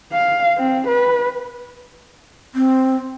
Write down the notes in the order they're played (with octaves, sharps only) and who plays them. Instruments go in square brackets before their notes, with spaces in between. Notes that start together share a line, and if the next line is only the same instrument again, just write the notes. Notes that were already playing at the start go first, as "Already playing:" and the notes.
[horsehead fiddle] F5
C4
B4
[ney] C4